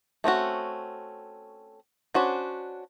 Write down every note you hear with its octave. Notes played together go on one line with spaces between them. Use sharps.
A3 C4 C#4 F#4
C#4 D4 F#4 C5